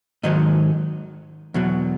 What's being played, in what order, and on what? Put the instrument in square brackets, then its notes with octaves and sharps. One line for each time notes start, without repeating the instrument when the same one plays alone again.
[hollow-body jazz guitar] G#2 D#3 F#3 D#5
E2 B2 F#3